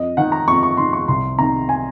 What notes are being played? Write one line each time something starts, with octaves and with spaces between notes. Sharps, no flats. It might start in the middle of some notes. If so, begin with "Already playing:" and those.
Already playing: F2 D#5
D#3 F#5
A#5
F2 C#6
C#6
D#3 C6
C#6
C2 C6
C3 D#3 A#5
G#5